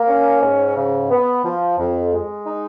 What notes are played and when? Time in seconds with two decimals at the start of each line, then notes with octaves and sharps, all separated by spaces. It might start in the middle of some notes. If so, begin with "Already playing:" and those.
Already playing: A#3
0.08 C#4
0.41 G#2
0.76 C#3
1.10 B3
1.44 F3
1.78 F2
2.11 G#3
2.46 D#4